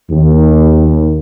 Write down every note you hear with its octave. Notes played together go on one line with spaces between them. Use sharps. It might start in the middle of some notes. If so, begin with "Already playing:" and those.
D#2